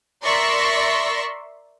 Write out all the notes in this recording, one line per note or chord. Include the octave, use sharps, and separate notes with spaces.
A#4 D5 E5 C6 C#6 A#6